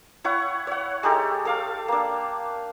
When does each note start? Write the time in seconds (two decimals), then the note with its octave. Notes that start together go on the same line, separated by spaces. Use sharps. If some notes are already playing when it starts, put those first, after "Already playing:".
0.24 E4 C#5 F#5 C#6
0.67 C#5 F#5
1.03 G#3 D#4 G4 A4
1.45 A4 F5 D6
1.88 A#3 D4